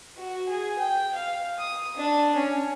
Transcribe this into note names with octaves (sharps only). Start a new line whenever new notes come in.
F#4
G#4
G5
F5
D#6
D4
C#4